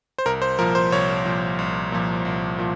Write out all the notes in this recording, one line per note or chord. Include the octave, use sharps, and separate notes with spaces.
C5
C2 A#4
C5
A#2 F3 A#4
C5
C2 C#5
A#2 F3
C2
A#2 F3
C2
A#2 F3